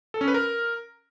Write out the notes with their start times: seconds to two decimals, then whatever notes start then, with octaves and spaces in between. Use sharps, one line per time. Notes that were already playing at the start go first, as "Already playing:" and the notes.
0.14 A4
0.21 C#4
0.28 B4
0.34 A#4